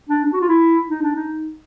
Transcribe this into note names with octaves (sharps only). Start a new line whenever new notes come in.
D4
D4
F#4
F4
E4
D#4
D4
D#4